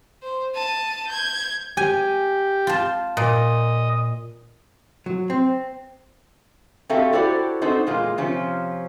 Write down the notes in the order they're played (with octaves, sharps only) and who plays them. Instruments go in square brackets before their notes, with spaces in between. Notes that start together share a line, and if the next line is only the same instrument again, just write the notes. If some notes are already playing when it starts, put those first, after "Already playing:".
[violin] C5
A5 D#7
G6 G#6
[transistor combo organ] G4 [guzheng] G#5
[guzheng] F4 A5
[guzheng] A#2 [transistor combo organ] D#5
[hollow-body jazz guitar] F#3
C4
[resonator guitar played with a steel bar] C4 F#4 G4 A4 E5 F5
E4 F#4 G4 A4 C5 D5
C4 D4 D#4 F#4 A4 C5
E2 A#2 G#3 A#3 F4
C3 F3 C#4